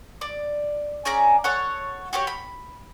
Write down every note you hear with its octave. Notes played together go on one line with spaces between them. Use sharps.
D5
C#4 G#4 D5 A#5
A4 C#5 F#5
F#4 G4 C#5
B5